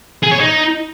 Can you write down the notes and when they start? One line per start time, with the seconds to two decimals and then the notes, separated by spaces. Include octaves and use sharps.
0.23 G#4
0.31 C#5
0.40 D#4